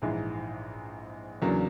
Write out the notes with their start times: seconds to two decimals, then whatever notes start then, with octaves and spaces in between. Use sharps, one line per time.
0.02 A#1 G#2 E3 G#3
1.42 E2 C#3 F#3 A#3 D4